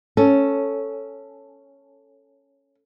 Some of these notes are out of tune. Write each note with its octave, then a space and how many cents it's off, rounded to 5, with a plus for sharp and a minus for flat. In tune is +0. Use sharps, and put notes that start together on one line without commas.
C#4 +0 A4 +0